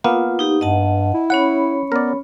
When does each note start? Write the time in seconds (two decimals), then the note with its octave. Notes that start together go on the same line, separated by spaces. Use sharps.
0.04 A#3 B3 F4
0.39 D#4 G4
0.61 G2 D#5 F#5 A5
1.14 E4
1.30 C#4 C#5 F#5 B5
1.92 B3 A#4 D5